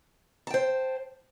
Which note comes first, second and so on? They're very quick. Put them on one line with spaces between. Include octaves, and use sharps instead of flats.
A5 G5 C5